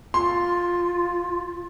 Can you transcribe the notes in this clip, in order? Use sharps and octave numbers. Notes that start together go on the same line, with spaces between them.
F4 C6